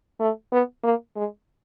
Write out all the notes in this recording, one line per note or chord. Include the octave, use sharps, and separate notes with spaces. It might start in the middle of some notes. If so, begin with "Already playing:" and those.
A3
B3
A#3
G#3